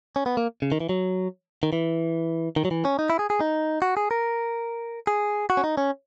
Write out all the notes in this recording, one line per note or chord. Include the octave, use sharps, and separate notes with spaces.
C#4
B3
A#3
C#3
D#3
E3
F#3
D#3
E3
D#3
F#3
E3
C#4
D#4
E4
G#4
G#4
D#4
F#4
G#4
A#4
G#4
F#4
C#4
D#4
C#4